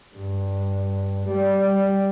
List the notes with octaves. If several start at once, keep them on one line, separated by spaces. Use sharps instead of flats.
G2
G3